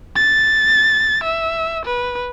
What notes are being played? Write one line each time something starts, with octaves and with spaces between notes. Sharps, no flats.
A6
E5
B4